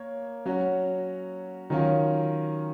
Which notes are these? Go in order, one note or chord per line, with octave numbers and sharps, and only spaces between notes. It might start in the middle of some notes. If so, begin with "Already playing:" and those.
Already playing: A#3 C#5
F#3 C#4 F#4
D#3 F#3 C#4 F4